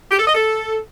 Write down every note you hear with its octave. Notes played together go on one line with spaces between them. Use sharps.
G4
A4
D#5
A4